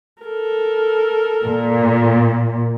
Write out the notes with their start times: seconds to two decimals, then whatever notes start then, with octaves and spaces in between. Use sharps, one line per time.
0.23 A4 A#4
1.45 A#2